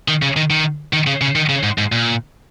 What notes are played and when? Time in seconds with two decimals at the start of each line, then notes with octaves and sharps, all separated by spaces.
0.08 D#3
0.22 C#3
0.36 D#3
0.50 D#3
0.93 D#3
1.07 C#3
1.21 C#3
1.36 D#3
1.49 C#3
1.63 G#2
1.78 G#2
1.92 A#2